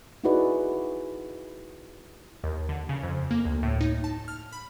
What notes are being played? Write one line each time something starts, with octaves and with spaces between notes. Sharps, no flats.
D#4 E4 F#4 G#4 B4 D5
D#2
D3
C#3
F2
A#3
D2
A2
D#4
A5
F6
B5